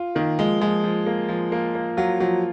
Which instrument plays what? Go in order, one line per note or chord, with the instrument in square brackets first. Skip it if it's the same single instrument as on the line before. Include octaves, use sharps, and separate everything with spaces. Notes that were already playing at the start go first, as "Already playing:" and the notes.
Already playing: [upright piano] F4
[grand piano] D#3 [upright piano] A#3
[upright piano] F3 [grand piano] G#3
[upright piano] F3 [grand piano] G#3
[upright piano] F3
A#3
F3
A#3
A#3
[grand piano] F#3 [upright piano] F4
[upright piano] F3 [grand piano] F#3